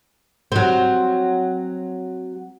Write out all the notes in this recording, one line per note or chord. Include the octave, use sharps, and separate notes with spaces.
F#3 C4